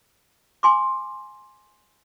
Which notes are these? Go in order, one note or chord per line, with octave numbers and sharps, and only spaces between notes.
G#5 C6 D6